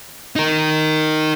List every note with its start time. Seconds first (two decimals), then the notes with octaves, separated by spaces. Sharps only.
0.36 D#4 A#4